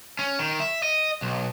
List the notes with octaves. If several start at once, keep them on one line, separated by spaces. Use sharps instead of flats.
C#4
D#3
E5
D#5
B1